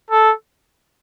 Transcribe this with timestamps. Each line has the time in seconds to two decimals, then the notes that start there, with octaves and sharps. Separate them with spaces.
0.10 A4